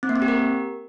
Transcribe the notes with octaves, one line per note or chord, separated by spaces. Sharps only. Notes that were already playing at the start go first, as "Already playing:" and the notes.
C4
A#3
C4
G4
A#4